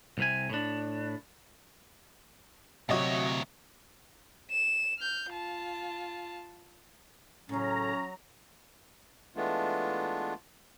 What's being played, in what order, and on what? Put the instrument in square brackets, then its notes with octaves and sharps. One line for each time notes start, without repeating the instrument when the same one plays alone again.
[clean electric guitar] C2 C3 G#5
A2 D4
[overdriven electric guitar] D2 C#5 [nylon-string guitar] C3 F#3 [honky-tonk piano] F#4 D#5 E5
[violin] E7
F6 G6
F4 A5
[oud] A2 C#3 [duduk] F#3 [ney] C#4 [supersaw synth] A#5
[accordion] E3 G#3 A3 B3 D4 F4